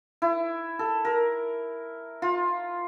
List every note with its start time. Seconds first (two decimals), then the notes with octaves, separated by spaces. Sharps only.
0.22 E4
0.79 A4
1.05 A#4
2.22 F4